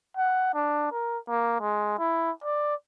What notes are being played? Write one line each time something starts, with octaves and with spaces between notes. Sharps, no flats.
F#5
D4
A#4
A#3
G#3
E4
D5